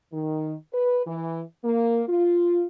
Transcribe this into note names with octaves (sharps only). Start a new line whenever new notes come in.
D#3
B4
E3
A#3
F4